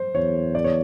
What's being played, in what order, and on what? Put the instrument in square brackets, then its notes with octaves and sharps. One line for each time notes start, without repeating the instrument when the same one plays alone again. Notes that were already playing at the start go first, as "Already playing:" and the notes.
Already playing: [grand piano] C5
[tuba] E2 [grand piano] C#5
[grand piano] D5
C#5